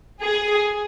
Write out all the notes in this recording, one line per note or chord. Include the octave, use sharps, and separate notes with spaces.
G#4